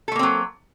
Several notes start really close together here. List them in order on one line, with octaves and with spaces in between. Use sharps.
A4 A3 A#3 C4 F#3